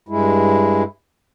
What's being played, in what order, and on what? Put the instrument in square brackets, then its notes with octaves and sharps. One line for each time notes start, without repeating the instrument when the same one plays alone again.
[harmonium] G2 G#3 E4